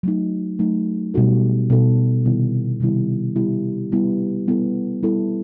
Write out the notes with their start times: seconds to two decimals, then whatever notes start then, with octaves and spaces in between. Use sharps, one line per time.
0.03 F#3 A3 D#4
0.59 F#3 A3 D#4
1.14 B2 G3 D#4 F#4 A4
1.70 B2 G3 D#4 F#4 A4
2.25 C3 D#3 G3 B3 E4
2.80 C3 D#3 G3 B3 E4
3.36 G3 B3 E4 G4
3.92 G3 B3 E4 G4
4.48 G3 B3 E4 A4
5.03 G3 B3 E4 A4